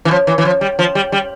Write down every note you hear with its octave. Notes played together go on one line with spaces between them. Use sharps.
E3
F3
E3
E3
F3
G3
F3
G3
G3